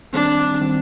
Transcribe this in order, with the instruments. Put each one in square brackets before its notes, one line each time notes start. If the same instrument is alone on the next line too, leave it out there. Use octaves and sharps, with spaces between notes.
[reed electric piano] D#3 G3 C4 [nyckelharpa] D4
[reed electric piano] D#3 G3 C4